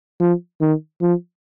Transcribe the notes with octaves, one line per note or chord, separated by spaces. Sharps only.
F3
D#3
F3